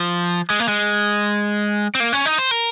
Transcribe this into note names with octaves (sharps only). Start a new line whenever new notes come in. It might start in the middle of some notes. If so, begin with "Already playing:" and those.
Already playing: F3
G#3
A#3
G#3
C4
A#3
C#4
D#4
C5
A#4